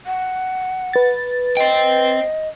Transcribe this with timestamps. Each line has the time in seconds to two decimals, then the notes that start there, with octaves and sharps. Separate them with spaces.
0.06 F#5
0.93 B4 A6
1.57 C5 D#5 G5